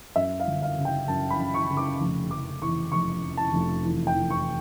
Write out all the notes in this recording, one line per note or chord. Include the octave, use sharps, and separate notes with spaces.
F#2 E5
F5
G1
F5
C#3
G5
F#2 A5
B5
F#2
C#6
C#3
D6
F1
F1 D6
E2 C#6
F1 C#6
F1
A5
F1
E2
G5
E2
C#6